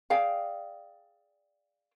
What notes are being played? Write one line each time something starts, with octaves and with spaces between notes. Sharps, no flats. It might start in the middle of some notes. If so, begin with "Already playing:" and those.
G#4 D5 F5 G5